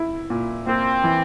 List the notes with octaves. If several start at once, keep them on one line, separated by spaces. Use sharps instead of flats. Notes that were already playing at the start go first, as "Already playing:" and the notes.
Already playing: E4
A#2
A#3 C4
E3